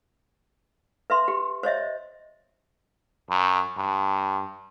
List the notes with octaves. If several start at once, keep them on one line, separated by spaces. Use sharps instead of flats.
B4 E5 C6
G4
C5 C#5 D#5 E5
F#2
G2